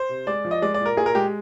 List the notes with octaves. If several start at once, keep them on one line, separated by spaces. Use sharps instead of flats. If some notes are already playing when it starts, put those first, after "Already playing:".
Already playing: C5
C3
G#3 D5
F3
D#5
G#3 D5
D5
A#2
A#4
A#2 G#4
A#4
G#3 G4